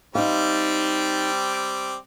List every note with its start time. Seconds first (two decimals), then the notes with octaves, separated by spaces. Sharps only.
0.15 G3 C4 D#4 F5 D6